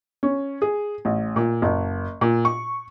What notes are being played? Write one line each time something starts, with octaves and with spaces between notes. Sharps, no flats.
C#4
G#4
A1
A#2
F#1
A#2
C#6